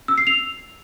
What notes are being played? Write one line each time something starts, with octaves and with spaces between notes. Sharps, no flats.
E6
C7
F7